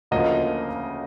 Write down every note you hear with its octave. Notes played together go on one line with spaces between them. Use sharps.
D2 C#3 F3 A#3 D#5